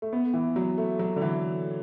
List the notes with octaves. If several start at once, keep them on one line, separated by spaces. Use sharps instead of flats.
A3
B3
E3
F#3
A3
F#3
D3
E3